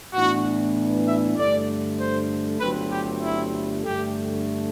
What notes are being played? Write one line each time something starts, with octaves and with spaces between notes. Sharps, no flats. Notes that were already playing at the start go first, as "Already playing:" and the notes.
A2 E3 B3 D4 F#4
E5
G2 D3 A3 D5
C5
G1 G2 F#3 A3 C4 B4
G4
E4
G2 D3 A3 G4